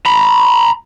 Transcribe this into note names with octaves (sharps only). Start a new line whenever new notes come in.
A#5 B5